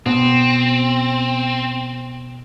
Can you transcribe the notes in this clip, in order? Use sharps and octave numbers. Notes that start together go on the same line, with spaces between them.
B2 C4